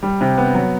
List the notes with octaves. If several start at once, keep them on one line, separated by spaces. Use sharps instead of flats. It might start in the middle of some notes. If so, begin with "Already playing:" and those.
G3
C3
B3
F#3